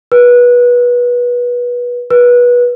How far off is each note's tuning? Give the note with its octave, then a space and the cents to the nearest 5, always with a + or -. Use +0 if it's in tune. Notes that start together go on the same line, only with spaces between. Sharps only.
B4 -25
B4 -25